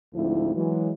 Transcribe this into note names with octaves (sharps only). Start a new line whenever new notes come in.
D2 G#2 F3 C4 E4
E3 F#3 G#3